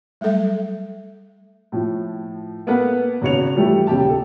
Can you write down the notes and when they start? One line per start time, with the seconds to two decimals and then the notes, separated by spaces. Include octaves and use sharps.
0.21 F#3 G3 A3 A4 E5
1.72 A2 F3
2.67 A#3 B3 A4 B4 F#5
3.22 G#1 C#3 F#4 C#5 C#7 F7
3.55 E3 F3 G3 A3 G4
3.87 D#1 C#3 G4 A5
4.09 A4